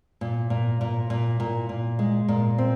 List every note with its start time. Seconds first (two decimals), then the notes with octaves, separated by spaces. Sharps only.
0.21 A#2
0.50 A#2
0.81 A#2
1.10 A#2
1.40 A#2
1.69 A#2
1.99 G#3
2.28 A#2
2.58 C4